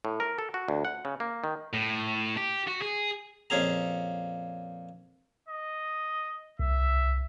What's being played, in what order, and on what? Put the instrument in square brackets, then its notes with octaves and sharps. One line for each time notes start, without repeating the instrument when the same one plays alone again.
[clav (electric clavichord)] A2
A#4
A4
F#4
D2
F#5
C#3
A#3
D#3
[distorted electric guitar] A2
G4
F#4
G#4
[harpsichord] F2 A#2 C#4 G#4 A#5
[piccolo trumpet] D#5
[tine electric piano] C2 [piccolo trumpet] E5